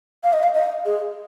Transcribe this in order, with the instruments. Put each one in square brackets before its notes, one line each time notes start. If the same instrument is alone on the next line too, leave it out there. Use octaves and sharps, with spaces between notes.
[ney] F5
D#5
F5
D#5
G#4